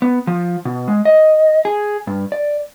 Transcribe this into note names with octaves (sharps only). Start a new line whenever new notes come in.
B3
F3
B2
G#3
D#5
G#4
G2
D5